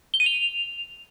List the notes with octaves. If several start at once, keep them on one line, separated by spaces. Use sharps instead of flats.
G7
D#7
F7